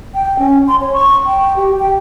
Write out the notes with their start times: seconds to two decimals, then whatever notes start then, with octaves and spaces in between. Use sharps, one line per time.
0.14 G5
0.39 C#4
0.68 C6
0.81 C#5
0.93 C#6
1.26 G5
1.56 G4
1.79 G5